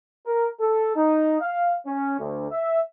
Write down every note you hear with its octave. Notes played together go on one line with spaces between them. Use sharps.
A#4
A4
D#4
F5
C#4
D2
E5